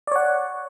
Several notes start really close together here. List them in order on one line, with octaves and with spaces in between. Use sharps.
D5 C#5 F#5